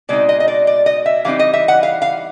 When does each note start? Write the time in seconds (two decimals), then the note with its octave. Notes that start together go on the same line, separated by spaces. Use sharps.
0.09 B2 G#3 C4 D#4 D5
0.29 D#5
0.40 D#5
0.48 D5
0.67 D5
0.86 D#5
1.06 E5
1.25 E3 G3 C4 D#4 F5
1.39 D#5
1.53 E5
1.68 F#5
1.83 F5
2.02 F5